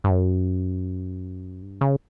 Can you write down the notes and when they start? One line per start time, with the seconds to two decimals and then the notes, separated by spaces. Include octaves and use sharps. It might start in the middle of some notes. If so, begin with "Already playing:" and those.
0.04 G2
0.11 F#2
1.62 G2
1.81 C#3